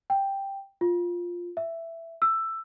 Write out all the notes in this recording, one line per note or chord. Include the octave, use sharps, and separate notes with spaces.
G5
F4
E5
E6